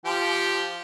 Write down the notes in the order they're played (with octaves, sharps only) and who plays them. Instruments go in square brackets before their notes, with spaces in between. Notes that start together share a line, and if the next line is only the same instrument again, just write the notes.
[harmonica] F3 G4